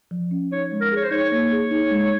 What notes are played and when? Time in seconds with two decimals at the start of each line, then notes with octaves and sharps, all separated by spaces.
0.11 F3
0.31 C#4
0.52 D#4 C#5
0.72 G#3
0.81 A#4
0.92 G#4 C#5
1.03 C5
1.11 D#4 C#5
1.32 A#3
1.52 G#4
1.71 D#4
1.91 G#3